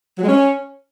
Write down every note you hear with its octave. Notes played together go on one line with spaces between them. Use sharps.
F#3
G#3
C#4